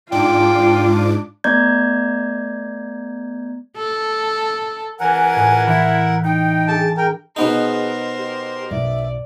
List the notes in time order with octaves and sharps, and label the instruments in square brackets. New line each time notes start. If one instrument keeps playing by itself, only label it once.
[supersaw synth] G#2 D4 D6 [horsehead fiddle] F4 [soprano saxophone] G5
[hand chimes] A3 B3 D5 A#5 G6 G#6
[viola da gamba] A4
[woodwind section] C#2 E3 G#5 [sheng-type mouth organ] A#4 F#5
[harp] A2
[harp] E3 A3 [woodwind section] E4
[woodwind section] D#4 G5
[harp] D4 G#4 A4 [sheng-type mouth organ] A5
[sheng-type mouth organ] A#4 G5
[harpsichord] B2 B3 D#4 [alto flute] G#4 [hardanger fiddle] A#4 C5
[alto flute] G4
[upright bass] B1 F#2 [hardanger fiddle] D5 [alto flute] E5